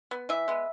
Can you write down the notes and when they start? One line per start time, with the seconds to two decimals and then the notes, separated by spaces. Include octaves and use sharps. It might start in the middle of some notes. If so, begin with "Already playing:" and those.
0.11 B3
0.29 E3 E5
0.48 G#3 B3